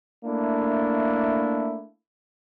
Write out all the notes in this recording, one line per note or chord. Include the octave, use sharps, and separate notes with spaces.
A3 A#3 D4 E4